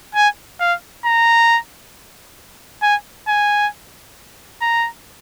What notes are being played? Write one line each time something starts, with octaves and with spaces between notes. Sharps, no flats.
G#5
F5
A#5
G#5
G#5
A#5